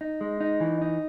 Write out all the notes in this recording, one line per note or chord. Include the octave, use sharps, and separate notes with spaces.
D#4
G#3
D#4
E3
D#4